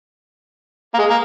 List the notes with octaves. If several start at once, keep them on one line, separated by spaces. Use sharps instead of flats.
A#3
G#3
A#3